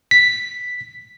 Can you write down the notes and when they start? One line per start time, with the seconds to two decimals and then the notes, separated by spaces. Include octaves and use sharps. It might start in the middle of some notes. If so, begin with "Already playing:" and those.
0.11 B6